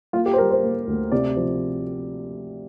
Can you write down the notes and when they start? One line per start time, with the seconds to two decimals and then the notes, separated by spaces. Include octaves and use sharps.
0.13 A#3 F4
0.26 G4
0.33 C5
0.38 G3 A#4
0.51 C5
0.63 A#3
0.87 D2
1.12 C3 D5
1.37 F3